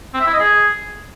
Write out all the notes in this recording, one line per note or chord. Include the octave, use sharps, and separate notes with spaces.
C4
E5
E4
D#5
G#4